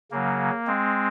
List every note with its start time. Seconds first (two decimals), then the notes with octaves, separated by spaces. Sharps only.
0.11 C#3 F#3 A#3
0.66 G#3 C4